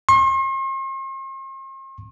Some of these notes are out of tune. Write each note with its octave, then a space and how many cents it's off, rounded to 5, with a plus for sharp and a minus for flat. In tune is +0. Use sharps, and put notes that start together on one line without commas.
C6 +45